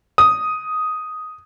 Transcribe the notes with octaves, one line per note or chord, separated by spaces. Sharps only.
D#6